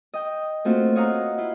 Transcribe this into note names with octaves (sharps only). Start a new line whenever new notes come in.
D#5 G5
A3 A#3 C4 F4 F#4
C#5 D#5 F5 F#5 A#5
E4 F4